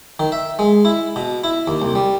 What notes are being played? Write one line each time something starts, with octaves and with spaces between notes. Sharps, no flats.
D#3
E5
G#3
E4
B2
E4
D#2
C2
G3